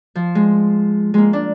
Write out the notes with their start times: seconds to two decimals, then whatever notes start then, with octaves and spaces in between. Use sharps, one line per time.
0.15 F3
0.35 G#3
1.14 G#3 A#3
1.33 D4